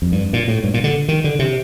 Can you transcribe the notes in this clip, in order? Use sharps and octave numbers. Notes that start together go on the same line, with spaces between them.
F2
G2
A#2
A2
G2
A#2
D3
D#3
D3
C3